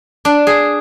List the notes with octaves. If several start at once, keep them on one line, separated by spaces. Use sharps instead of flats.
D4
G#4